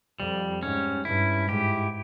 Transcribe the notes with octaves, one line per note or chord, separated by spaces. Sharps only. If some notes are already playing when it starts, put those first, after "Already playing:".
F2 G3
G#2 C#4
G2 E4
G#2 G4